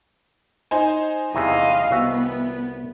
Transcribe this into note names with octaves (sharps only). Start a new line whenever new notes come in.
D#4 C5 G#5
E2 C3 E3 D#5 F5
C2 B3 F#4 E5